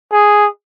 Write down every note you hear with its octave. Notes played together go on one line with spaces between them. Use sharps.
G#4